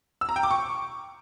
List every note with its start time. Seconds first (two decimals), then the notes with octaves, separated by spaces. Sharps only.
0.21 E6
0.29 A#5
0.36 G5
0.43 D6
0.51 C#6